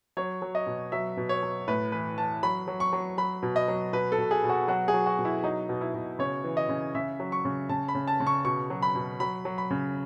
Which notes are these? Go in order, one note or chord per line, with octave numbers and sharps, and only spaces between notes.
F#3 C#5
F#3
D#5
B2
F#3 E5
B2
C#5
F#3
A2 B4
E3 B4
E3 A5
F#3 B5
F#3
C#6
F#3
F#3 B5
B2
D#5
F#3
B2 B4
A4
B2
G#4
B2
F#4
F#3 F#4
G#4
F#3
F#4
B2
E4
F#3 D#4
B2
E4
B2
C#3 C#5
E3
D#5
C#3
C#3 E5
F#3
C#6
C#3
C#3 A5
B5
C#3
A5
C#3
C#6
B2 C#6
F#3
B5
B2
F#3 B5
F#3
B5
C#3